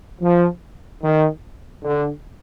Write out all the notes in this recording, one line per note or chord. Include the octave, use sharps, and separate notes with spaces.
F3
D#3
D3